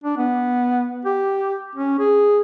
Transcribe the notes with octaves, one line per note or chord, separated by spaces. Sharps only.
D4
B3
G4
C#4
G#4